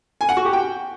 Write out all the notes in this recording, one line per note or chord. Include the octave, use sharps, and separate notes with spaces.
G#5
F#5
F#4
G4
G5